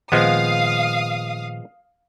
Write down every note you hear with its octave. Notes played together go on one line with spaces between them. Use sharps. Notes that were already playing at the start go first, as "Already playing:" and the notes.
A#2 D#3 F3 G#3 B3 F5 D#6